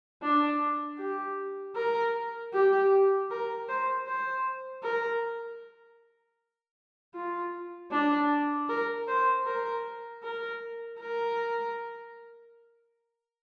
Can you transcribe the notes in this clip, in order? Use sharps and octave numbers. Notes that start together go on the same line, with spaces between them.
D4
G4
A#4
G4
A#4
C5
C5
A#4
F4
D4
A#4
C5
A#4
A#4
A#4